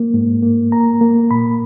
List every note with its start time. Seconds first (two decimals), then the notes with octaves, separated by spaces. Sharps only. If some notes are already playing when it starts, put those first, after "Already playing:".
Already playing: A#3
0.14 G#2
0.43 A#3
0.72 A#3 A#5
1.01 A#3
1.31 A#2 B5